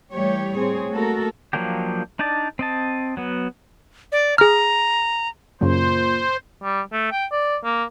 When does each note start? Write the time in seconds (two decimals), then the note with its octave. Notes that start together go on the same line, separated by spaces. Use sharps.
0.12 E3 G3 A3 G4 C#5
0.56 A2 C4 G#4 C#5
0.91 A3 A#3 F#4 A4 A#4
1.53 F3 F#3 A#3 D4 G4
2.19 D4 D#4 D5 A5
2.59 C4 D#5 A5
3.17 F#3 B3
4.12 D5
4.38 G#4 A#5 F6
5.61 F#2 A#2 C#3 F#3 C5
6.63 G3
6.92 A3
7.12 G5
7.31 D5
7.64 A#3